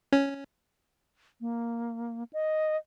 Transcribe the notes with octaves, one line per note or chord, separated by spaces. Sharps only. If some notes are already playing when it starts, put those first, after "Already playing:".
C#4
A#3
D#5